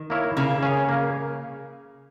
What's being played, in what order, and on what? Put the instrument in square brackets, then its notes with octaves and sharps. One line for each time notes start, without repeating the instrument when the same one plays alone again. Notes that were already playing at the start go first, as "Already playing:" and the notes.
Already playing: [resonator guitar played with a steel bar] D#3
[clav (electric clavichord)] A#3 E4 A#4 C#5
[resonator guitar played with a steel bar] C#3 [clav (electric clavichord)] A#3
[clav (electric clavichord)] C#4 G#4 C#5
A#3